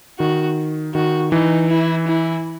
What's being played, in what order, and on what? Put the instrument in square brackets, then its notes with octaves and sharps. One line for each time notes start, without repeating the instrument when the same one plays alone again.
[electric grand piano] D#3 [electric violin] F#4
[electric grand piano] D#3 [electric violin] F#4
[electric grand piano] E3 [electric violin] D#4
[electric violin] E4
E4